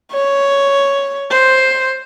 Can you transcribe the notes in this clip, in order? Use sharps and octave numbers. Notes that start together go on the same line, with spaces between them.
C#5
C5